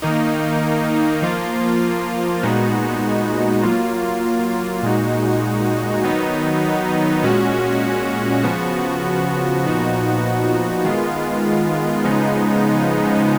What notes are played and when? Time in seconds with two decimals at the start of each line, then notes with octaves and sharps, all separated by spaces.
0.02 D#3 A#3 D#4
1.22 F3 A#3 F4
2.43 A#2 G#3 B3 D#4 F#4
3.63 F#3 A#3 F4
4.83 A#2 G#3 D#4 F#4
6.04 D#3 F#3 B3 D#4
7.23 A#2 G#3 C#4 F#4
8.43 C#3 F3 B3 F#4
9.64 A#2 F3 B3 D#4 F#4
10.84 D#3 G#3 B3 F4
12.04 C#3 F3 G#3 B3 D#4